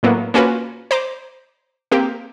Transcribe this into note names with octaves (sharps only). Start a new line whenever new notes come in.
A2 F#3 A#3 B3
A#3 C#4 F4 F#4 B4
C5 A#5 D6
A#3 C4 G4